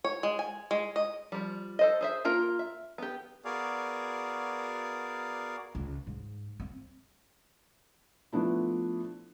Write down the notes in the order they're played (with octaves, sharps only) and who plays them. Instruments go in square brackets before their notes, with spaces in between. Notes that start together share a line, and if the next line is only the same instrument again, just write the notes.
[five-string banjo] C#5
G#3
G#5
G#3
D#5
F3 G3
A4 C5 D#5
G#4 C5 E5
A#3 F4 A#4
E5
B3 G4
[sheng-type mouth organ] B3 F#4 G#4 A#4 D5 F5
[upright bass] C#2
G#2
C4
[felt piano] F3 A3 B3 D4 E4